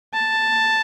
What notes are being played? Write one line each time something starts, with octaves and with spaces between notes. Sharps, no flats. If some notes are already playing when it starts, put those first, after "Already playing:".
A5